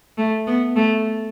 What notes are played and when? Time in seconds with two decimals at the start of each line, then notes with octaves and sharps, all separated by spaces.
0.18 A3
0.47 B3
0.76 A3